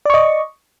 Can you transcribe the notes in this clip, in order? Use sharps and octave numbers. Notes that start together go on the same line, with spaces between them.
D5 D#5 C#6